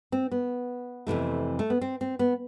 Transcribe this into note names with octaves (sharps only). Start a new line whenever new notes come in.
C4
B3
F2 C3 E3 A3
A3
B3
C4
C4
B3